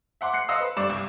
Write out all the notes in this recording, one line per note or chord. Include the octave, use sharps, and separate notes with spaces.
E5 F#5 C6 D6
F#6 C7 C#7
D#5 F5 C6 D#6 E6
B4
G2 D5 C#6 D6 E7
C2